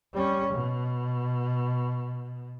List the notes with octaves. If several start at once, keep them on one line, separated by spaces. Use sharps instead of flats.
G3 C#4
B2